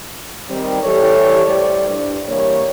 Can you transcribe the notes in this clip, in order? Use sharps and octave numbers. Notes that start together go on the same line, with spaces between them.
D#3 G3 C4
E3 G3 G4 A4 C#5
A2 G3 C5 D5
G2
E3 G3 A#3 C#5